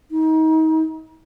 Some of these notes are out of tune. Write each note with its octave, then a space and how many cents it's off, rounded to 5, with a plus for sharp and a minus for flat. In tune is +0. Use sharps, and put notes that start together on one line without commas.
D#4 +30